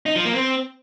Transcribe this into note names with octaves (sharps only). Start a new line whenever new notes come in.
D#4
F3
A#3
C4